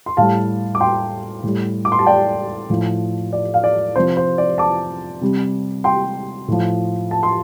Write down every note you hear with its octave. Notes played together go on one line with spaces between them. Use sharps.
C6
A2 G3 F5 A5
D6
G5 C6
A2 G3
D6
C6
A5
D5 G5
A2 F3
D5
F5
D5
C3 F3 C5
C5
D5
A5 D6
C3 G3
G5 C6
A2 F3
A5
C6